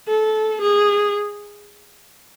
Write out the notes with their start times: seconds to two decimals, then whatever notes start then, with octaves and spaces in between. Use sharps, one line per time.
0.08 A4
0.62 G#4